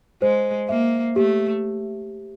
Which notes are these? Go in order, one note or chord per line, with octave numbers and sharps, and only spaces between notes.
G#3 C5
A#3 E5
A3 G4